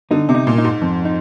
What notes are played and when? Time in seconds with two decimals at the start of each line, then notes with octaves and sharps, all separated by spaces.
0.11 D3 D#4
0.29 C3
0.35 D#4
0.47 A#2
0.58 D#4
0.64 G#2
0.82 F2
1.05 D#4